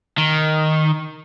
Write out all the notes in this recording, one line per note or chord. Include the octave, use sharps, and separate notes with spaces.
D#3